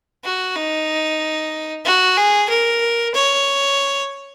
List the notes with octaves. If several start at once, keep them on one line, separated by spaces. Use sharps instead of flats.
F#4
D#4
F#4
G#4
A#4
C#5